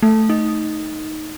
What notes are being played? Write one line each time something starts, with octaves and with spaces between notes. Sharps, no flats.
A3
D#4